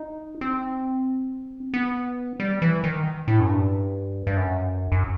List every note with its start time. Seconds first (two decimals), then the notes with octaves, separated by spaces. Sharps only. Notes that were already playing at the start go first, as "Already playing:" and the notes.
Already playing: D#4
0.41 C4
1.74 B3
2.40 G3
2.62 E3
2.84 D#3
3.28 A2
3.40 F#2
3.49 G2
4.27 G2
4.37 F#2
4.92 F#2